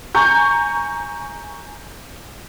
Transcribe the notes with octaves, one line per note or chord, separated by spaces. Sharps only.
G#5 A#5 C#6 G6